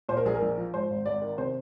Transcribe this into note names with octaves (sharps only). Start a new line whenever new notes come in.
A#2 C5
A#4
A#1 G#4
A#4
A#1
F3
G#2 C5
G#1
G#1 D5
D#3
C3 C5